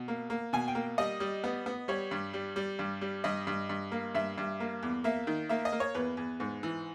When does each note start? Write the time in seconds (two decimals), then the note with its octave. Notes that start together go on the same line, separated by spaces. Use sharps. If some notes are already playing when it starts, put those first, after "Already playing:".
Already playing: B2
0.08 A#3
0.30 A#3
0.53 B2 G#5
0.68 G5
0.75 A#3
0.98 G3 D#5
1.20 G3
1.44 B3
1.66 B3
1.88 G3 C#5
2.11 G2
2.34 G3
2.56 G3
2.79 G2
3.01 G3
3.24 G2 D#5
3.47 G2
3.69 G2
3.92 A#3
4.15 G2 E5
4.38 G2
4.60 A#3
4.83 E2
5.04 A#3 E5
5.27 D#3
5.49 A#3 E5
5.65 D#5
5.72 A#3
5.80 C#5
5.95 E2 B4
6.17 E2
6.40 G#2
6.63 E3